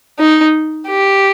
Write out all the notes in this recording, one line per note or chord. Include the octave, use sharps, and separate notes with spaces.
D#4
G4